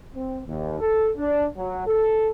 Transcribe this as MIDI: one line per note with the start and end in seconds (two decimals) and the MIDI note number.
0.14 0.39 60
0.46 0.78 39
0.80 1.10 69
1.17 1.46 62
1.57 1.85 54
1.86 2.29 69